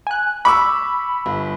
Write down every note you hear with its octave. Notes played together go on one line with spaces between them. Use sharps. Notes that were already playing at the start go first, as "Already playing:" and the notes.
G#5 F#6
B5 C#6 D6 E6
G1